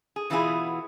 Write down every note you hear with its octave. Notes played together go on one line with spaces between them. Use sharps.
G#4
B2 E3 B3 E4 F4 G#4